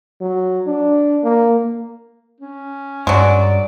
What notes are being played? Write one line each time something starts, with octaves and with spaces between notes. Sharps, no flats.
F#3
D4
A#3
C#4
G2 F#3 G#3 D5